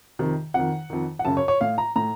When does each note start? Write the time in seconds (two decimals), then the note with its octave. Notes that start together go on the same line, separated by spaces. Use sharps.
0.19 F2 C3 D#3
0.54 F2 D#3 F#5
0.90 F2 D#3
1.19 F#5
1.25 F#2 C#3 A5
1.37 C#5
1.48 C#5
1.61 A2 F5
1.78 A#5
1.96 A2 A#5